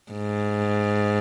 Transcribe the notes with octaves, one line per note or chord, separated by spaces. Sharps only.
G#2